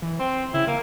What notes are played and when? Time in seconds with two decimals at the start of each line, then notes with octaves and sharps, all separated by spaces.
0.02 E3
0.20 C4 C6
0.54 C#3 E4
0.67 A#3 A#4